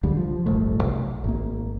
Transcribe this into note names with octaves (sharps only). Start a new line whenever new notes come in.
C#2 D3 G3
F3
D1 G1 C2 A3
B1
G#1 A#3